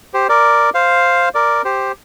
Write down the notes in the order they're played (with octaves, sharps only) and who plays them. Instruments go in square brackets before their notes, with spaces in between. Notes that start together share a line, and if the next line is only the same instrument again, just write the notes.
[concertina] G4 C5
A#4 D5
C5 F5
A#4 D5
G4 C5